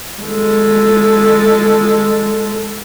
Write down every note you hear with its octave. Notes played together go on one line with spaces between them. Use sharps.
G#3 A4